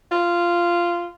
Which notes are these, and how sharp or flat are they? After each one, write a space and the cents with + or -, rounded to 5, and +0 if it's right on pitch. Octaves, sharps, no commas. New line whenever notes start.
F4 -10